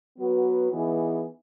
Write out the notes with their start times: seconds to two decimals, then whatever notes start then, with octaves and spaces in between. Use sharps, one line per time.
0.17 F#3 B3 F#4 B4
0.70 E3 B3 D#4 G#4